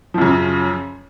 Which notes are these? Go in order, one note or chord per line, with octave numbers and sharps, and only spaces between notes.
F#2 C#3 F3